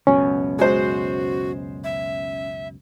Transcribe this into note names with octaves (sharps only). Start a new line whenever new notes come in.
C#2 F#2 B2 C#4
G#3 F#4 C5
E5